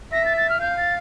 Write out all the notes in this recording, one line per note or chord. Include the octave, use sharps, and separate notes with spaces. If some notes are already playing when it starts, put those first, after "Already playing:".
E5 A#6
A6
A6
F6
F5 G6
A6